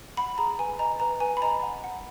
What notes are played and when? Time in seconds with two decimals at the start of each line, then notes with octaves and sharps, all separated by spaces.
0.17 F#5 B5
0.38 G#4 A#5
0.59 B4 G#5
0.79 D#5 A#5
1.00 B4 A#5
1.20 B4 G#5
1.37 B5
1.42 D#5 A#5
1.63 F#5
1.84 F#5